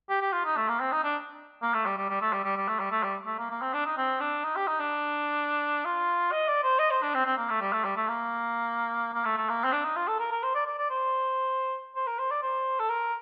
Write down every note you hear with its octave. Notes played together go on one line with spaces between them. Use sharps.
G4
G4
F4
D#4
A3
A#3
C4
D#4
D4
A#3
A3
G3
G3
G3
A3
G3
G3
G3
A3
G3
A3
G3
A3
A#3
A#3
C4
D4
D#4
C4
D4
D#4
G4
D#4
D4
F4
D#5
D5
C5
D#5
C5
D4
C4
C4
A#3
A3
G3
A3
G3
A3
A#3
A#3
A3
A3
A#3
C4
D4
D#4
F4
A4
A#4
A#4
C5
D5
D5
D5
C5
C5
A#4
C5
D5
C5
A4
A#4